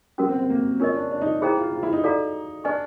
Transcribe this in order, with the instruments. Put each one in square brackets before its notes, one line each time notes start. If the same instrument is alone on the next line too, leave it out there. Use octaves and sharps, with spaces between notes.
[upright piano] F#3 [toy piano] C#4 F#4 A#4
[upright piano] C4
C4
A#3
[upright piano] C#4 [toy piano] F4 A#4 D#5
[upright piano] D4
D4
D#4
[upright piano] E4 [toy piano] G#4 C5 D#5 G5 A#5
[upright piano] F4
F4
E4
D#4
[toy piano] F#4 A4 D5 F5 A#5
[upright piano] D4 [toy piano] B4 D#5 G#5 C#6